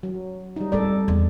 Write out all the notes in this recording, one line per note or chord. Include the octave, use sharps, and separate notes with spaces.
F#3
G3 D#4
G3 C4 A4 D5
E2